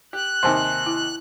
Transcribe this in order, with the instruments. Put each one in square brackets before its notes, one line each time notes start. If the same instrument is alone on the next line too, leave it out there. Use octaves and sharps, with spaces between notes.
[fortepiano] G4 [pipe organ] F#6
[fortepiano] D#2 C3 D#3 [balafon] C5 F#5 [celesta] G#5 A5 C6
[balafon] E4